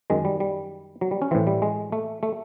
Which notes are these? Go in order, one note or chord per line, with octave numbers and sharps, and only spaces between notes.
F#2 D#3 G#3
G3
G3
F#3
G3
C#4
A2 E3 C4
G3
G#3
A3
A3